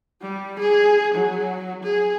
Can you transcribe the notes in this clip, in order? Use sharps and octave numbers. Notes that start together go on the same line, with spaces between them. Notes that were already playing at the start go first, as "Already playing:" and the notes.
G3
G#4
F#3
G#4